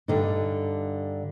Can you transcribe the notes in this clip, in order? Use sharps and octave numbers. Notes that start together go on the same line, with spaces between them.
G2 D3 D#4